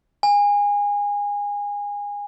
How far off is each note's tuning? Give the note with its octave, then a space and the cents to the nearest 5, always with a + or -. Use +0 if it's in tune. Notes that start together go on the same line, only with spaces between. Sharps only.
G#5 -25